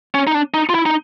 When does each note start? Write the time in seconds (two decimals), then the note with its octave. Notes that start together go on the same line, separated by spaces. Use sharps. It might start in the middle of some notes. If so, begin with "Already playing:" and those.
0.15 C#4
0.27 D#4
0.34 D4
0.54 D#4
0.69 F4
0.75 E4
0.86 D#4